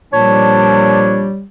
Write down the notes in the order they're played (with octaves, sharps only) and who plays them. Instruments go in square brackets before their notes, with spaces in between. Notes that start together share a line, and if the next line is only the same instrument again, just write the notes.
[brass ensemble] A#2 F3 D4 [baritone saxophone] G3 [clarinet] C#5 [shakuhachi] A5